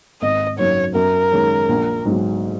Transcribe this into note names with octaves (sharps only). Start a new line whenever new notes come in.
G#1 D#5
F#2 F#3 D#4 C#5
F#2 A#4
D#3 G#3 C#4
A#1
G#2 F#3